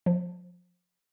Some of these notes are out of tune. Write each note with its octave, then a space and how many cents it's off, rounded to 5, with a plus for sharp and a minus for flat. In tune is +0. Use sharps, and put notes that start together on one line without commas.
F3 +30